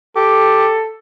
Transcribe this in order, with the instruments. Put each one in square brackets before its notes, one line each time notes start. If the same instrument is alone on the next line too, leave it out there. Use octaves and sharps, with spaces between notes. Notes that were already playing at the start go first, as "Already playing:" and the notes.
[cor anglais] G4 [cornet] A4